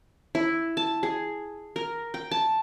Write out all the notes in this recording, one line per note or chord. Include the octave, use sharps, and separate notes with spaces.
E4
A5
G#4
A#4
G5
A5